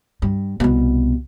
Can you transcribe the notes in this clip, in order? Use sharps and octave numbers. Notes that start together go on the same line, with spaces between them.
G2
C2 B2